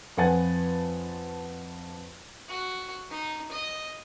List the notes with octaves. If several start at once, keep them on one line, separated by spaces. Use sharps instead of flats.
F2 F3 B4 F#5 G#5 A6
F#4
D#4
D#5